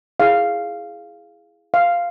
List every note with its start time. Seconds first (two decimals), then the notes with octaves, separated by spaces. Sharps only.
0.20 E4 G#4 C#5 F5
1.74 F5